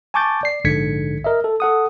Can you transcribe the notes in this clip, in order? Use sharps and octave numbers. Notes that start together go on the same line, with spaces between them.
G#5 A5 C#6 D6 G6 A6
D5 C7
A#1 G#2 D3 G#6 B6 C#7
A#4 D#5 E5
A4
A4 F#5 D#6